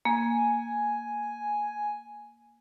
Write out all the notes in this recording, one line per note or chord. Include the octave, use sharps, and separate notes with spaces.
A#3 G#5